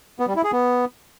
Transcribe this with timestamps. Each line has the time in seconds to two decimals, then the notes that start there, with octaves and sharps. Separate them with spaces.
0.19 B3
0.28 G3
0.36 E4
0.44 G#4
0.52 B3